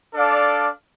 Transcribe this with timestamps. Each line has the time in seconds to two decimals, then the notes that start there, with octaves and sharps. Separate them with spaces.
0.12 D4 A4 D5 F5